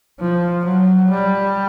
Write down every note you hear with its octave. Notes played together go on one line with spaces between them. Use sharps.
F3
F#3
G3